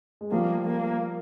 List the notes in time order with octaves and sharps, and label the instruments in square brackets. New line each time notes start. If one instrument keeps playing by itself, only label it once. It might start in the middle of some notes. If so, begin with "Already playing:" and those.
[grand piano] G#3
[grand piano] F3 G3 [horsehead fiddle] A#3
[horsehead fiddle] A#3